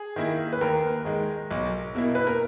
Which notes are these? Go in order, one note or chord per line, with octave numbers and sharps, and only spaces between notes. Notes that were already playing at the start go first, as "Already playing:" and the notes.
Already playing: G#4
D#3 A#3 E4
B4
D#2 A#4
D#3 G#3
B1
B2 A#3 E4
B4
A#4